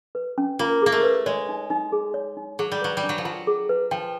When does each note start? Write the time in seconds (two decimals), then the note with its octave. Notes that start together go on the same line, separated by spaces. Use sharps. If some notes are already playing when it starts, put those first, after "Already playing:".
0.15 B4
0.38 C#4
0.59 A#3 F4
0.82 A#3 G#4
0.92 A3
1.03 B4
1.26 G#3 C#5
1.49 D#4
1.70 D#4
1.92 G#4
2.14 C#5
2.37 D#4
2.59 F#3 G#4
2.72 G3
2.82 F#3 B4
2.97 G3
3.03 D4
3.09 F#3
3.18 F3
3.25 F#3 F4
3.47 G#4
3.69 B4
3.91 F3 G5